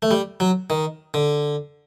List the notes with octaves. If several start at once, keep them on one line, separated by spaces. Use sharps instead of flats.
A3
G3
F#3
D#3
D3